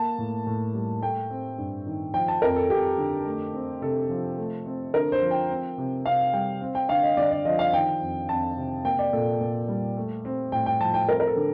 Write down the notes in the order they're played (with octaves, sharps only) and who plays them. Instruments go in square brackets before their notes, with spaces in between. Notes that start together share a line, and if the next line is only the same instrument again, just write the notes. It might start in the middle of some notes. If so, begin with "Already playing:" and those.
Already playing: [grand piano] A#3 A5
A2
A2
G3
A3 G5
C4
G2
D#3
F3 G5
A5
F2 A#4
A4
F2 G4
D3
A3
C4
C3 A4
F3
A3
C4
D3 A#4
C5
F3
G5
C4
C3
C3 F5
G3 G5
C4
G5
D3 F5
D#5
D3 D5
D5
F3 D#5
F5
D#3 G5
F2
F2 A5
C3
A#3 G5
D5
A#2 A4
A#2
G3
A3
C4
A2 G5
G5
F3 A5
G5
C4 A#4
A#4
A4
D3